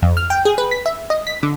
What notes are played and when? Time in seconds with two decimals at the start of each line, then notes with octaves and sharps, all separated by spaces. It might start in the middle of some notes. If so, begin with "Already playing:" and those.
0.02 F2
0.17 F6
0.30 G5
0.45 G#4
0.58 B4
0.71 B6
0.86 E5
1.10 D#5
1.27 B6
1.43 D3